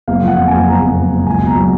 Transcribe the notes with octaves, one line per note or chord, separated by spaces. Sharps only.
F#1 F5
F3 F#5
F2
F#1 G#5
F#1 A#5
F#1
F#1
F#1
C#2 G#5
B2
A#5
F#3